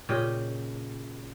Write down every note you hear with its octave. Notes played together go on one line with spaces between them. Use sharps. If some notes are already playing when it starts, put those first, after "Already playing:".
A#2 C#3 G4 D#5